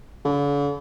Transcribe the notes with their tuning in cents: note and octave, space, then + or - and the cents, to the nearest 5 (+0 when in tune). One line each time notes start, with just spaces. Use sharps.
D3 -45